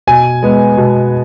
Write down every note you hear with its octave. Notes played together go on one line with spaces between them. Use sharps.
B2 G#5
G#3 B3
B2